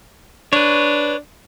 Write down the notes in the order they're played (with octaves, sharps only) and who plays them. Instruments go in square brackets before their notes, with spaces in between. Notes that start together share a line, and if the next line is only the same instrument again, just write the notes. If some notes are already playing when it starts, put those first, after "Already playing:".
[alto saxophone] D4 [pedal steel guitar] B4 C#5